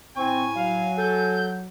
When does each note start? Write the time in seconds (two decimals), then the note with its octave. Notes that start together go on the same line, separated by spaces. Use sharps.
0.16 A2 C4 G#5 C#6
0.55 F#3 F5
0.98 A4 G6